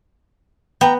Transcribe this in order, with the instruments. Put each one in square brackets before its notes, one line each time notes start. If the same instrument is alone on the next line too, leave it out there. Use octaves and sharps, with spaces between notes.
[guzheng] B3 [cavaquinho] G5 A#5